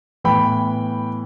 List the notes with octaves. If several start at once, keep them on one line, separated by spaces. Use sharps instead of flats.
A2 E3 B3 G5 B5